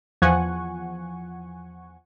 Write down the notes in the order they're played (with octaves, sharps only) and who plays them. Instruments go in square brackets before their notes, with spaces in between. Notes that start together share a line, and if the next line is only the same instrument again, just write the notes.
[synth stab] E2 F3 F#5 G#5 C#6